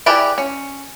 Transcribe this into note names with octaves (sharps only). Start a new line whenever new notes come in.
E4 G4 G#4 B4 D5
C#4